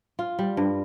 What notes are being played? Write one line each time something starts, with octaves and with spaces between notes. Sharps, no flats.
F4
G3
G2